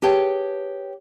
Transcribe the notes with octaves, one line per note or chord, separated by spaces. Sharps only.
G4 G#4 B4 C#5 G5 A5